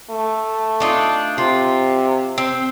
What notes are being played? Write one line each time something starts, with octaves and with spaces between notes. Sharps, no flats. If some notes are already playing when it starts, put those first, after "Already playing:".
A3
D4 D#4 F4
C3 F4
C4